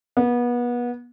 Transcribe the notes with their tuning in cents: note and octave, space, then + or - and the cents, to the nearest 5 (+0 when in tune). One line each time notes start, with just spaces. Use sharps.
B3 -30